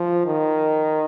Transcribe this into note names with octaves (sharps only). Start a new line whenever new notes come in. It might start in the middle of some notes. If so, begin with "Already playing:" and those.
Already playing: F3
D#3